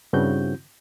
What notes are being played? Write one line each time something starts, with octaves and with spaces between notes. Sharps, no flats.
G2 C#3 C4 E4 F#4 G6